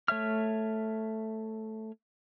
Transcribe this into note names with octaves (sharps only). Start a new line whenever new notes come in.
A3 C#5 E5 F6